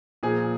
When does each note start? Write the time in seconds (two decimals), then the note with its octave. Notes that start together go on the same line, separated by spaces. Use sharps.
0.23 A#2 F3 G#4